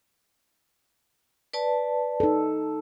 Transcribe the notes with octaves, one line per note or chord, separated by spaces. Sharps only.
B4 D5 A5
D#4 A4